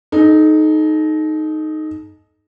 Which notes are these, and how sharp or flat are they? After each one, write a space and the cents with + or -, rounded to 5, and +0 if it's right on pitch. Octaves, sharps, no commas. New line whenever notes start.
D#4 -5 A4 -40